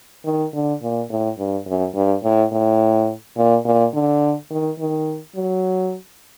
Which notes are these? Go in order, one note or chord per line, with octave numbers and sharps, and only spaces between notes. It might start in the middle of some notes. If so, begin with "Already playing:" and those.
D#3
D3
A#2
A2
G2
F#2
G2
A2
A2
A#2
A#2
D3
D#3
D#3
F#3